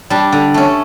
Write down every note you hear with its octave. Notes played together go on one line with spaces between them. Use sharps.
G3 D4
D3
A3 C#4